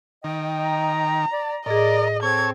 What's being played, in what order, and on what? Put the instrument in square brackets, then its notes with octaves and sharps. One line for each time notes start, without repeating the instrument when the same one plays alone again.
[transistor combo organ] D#3 [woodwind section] D#5 G5
[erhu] A#5
[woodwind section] D5
[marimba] A2 G#4 [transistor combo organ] A#4 [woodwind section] D5 [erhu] D#5
[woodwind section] C4 [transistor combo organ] A4 C#5 [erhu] G#6